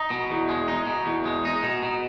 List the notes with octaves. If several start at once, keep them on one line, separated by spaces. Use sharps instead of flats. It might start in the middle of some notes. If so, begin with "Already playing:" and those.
Already playing: D#4
B2
E2
G#3
D#4
B2
E2
G#3
D#4
B2
B2